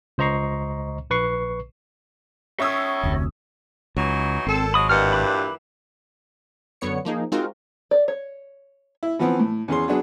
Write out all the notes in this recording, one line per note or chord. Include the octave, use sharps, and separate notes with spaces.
C#2 C5 D#5 A#5 C#6 C7
A#1 B4 C#6 C7
C#4 C#5 E5 C#6 D#6 E6
F1 D2 C3
C#2 E3 F#3 D#4
G#1 A#2 C4 A4
F3 F#3 G#3 B5 D#6
G2 A#2 E3 F#3 D#5 F#5 F6
B5 D6 F#6
F#2 D3 B3 C#5 C#7
F3 A#3 D#4 G#4
G#3 C4 D#4 F4 F#4 A#4
D5
C#5
E4
E3 F3 B3 C4
A2
E2 C#4 G#4 C6
F#3 B3 D4 G#4